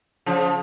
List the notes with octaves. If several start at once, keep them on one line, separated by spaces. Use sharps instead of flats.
C#3 F3